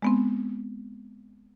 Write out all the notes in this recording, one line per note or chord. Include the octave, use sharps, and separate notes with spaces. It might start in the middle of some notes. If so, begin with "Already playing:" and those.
G#3 B3 C4